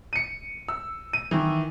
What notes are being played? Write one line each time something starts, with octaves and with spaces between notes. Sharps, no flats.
C#7 D#7
E6
D#7
D#3 E3